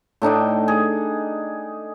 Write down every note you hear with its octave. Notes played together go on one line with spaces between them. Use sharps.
A2 D4 D#4 G5
G#4